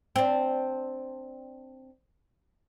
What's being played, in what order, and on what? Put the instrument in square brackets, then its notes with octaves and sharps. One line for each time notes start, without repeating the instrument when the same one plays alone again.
[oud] C4 D4